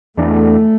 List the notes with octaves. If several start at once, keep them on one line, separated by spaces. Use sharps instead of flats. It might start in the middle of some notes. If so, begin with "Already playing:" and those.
E2 E3 A3 D4